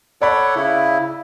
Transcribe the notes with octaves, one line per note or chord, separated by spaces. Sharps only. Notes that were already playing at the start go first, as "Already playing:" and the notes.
A4 C#5 D5 F#5 B5
C#3 E4